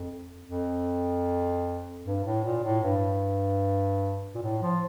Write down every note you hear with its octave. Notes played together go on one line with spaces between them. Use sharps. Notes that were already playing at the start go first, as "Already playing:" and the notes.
Already playing: F2
F2
G2
A2
A#2
A2
G2
A#2
A2
F3